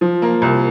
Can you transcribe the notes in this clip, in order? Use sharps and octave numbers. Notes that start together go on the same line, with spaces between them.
F3
A#3
C2